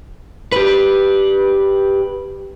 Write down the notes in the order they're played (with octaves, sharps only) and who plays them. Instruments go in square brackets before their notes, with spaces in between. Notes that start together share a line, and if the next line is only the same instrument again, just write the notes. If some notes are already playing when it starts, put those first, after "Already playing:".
[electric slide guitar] G4 B4